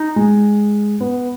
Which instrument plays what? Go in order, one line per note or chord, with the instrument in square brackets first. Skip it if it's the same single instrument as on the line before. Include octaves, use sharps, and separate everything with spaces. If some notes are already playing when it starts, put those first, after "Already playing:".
Already playing: [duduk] D#4
[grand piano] G#3
B3